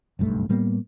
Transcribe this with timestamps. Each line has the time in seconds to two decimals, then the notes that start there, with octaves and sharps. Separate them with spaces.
0.19 F#1 B1 G2 A3
0.49 A2 G3 A#3 B3